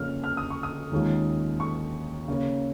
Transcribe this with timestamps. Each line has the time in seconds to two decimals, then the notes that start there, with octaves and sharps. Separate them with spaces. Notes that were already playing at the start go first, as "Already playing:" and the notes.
Already playing: F2 C#3 A#3 C#4 F4 F6
0.24 F6
0.37 D#6
0.50 C#6
0.63 D#6
0.91 D#2 D#3 G#3 C#4 F4
1.60 C#6
2.28 C#3 A#3 C#4